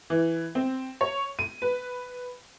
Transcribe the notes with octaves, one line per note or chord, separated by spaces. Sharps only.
E3
C4
C#5
D#7
B4